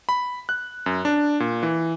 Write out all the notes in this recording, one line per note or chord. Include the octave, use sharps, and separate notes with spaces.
B5
F#6
F#2
D4
A#2
E3